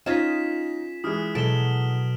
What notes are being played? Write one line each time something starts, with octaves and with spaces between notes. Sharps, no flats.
C#4 D#4 F4 G#4 D#5 B6 E7
E3 G#3 D#6 F6
B2 F#3 A4 D7 E7 G7